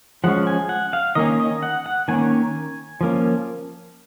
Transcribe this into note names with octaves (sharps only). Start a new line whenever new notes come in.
F3 G#3 C#4 F#5
G#5
F#5
F5
D#3 A#3 C#4 D#5
D#5
F#5
F#5
D#3 A#3 C#4 G#5
F3 A#3 C#4